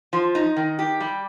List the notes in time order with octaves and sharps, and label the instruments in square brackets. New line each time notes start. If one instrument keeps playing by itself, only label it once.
[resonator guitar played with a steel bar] F3
D#4
D#3
G4
G3